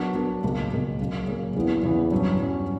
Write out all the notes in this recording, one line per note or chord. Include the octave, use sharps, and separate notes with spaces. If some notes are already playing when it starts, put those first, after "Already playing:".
Already playing: F#3 B3 D4 F#4 A#4
F#3 B3 D4 F#4 A#4
C#2 B2 A#3
C#2 B2 A#3
C#3 F#3 A#3
C#3 F#3 A#3
E2 C#3 E3 B3
E2 C#3 E3 B3
G2 F#3 C#4
G2 F#3 C#4